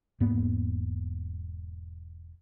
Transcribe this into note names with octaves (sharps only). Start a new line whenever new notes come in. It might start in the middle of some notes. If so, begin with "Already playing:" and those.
E1 G#2 A#3 B3